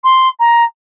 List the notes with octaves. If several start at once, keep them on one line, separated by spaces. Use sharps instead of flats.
C6
A#5